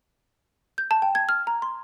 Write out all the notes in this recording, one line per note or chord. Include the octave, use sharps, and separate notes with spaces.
G6
A5
G5
G#6
F6
A#5
C6